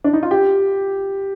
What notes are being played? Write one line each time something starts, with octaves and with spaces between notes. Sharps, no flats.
D4
D#4
F4
G4